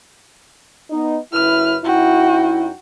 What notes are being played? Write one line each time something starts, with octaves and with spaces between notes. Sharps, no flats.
B3 D#4
F#2 C#3 E4 B4 F6
F#2 D#4 E4 F#4 G5